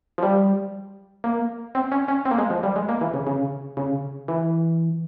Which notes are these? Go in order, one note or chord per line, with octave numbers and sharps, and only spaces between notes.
F3
G3
A#3
C4
C#4
C#4
C4
A#3
G#3
F3
G3
G#3
A#3
E3
C#3
C#3
C#3
E3